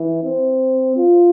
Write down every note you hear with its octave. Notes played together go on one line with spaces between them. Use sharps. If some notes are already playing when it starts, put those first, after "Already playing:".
Already playing: E3
C4
F4